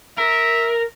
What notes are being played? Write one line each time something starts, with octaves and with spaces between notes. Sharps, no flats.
A#4 E5